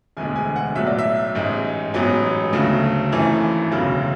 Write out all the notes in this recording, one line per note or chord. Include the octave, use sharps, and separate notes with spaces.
E1 D2 D3 G#3 G#5
G#5
F#5
B1 A2 F#3 E5
D5
E5
A1 G#2 G#3
A1 G#2 F#3 B3 G#5
D2 C#3 F#3 A3
G#1 F#2 E3 A3 G#5
E1 D2 C#3 F#3